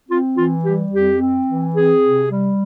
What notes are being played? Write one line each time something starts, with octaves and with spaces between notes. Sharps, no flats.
C4 F4
E3 F4
G3 G4
F2 G4
C4
E3
C4 G#4
C3
G3